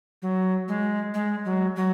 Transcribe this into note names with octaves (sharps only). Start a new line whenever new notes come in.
F#3
G#3
G#3
F#3
F#3